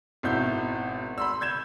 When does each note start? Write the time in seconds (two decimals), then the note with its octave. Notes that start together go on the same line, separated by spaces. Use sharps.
0.23 G#1 B2 E4 G6
1.18 B5 C6 E6
1.41 G6 G#6 E7